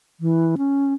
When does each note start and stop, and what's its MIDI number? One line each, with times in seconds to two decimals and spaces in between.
0.20 0.55 52
0.58 0.94 61